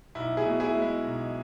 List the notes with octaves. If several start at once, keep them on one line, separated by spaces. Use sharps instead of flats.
B1 E4
E4 G#4
B2
E4 G#4
G#3
E4
B1